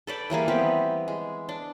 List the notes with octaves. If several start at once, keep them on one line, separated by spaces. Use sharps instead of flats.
A4 B4 D5 G5
E3 G3 A#3 G#4
B3 C4 G4 B4
G#3
D4